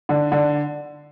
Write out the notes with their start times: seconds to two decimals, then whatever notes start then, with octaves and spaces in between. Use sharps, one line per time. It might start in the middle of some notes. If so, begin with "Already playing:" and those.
0.09 D3
0.32 D3